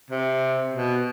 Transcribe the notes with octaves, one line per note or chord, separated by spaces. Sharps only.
C3
B2